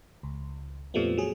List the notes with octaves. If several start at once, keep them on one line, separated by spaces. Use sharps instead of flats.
C#2
F2 A#2 F3 G3 A3 B3
F#3 G#4